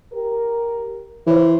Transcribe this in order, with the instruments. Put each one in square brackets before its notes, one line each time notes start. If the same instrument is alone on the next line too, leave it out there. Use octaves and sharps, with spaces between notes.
[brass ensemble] G4 A#4
[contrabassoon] E3 [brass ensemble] C5 C#5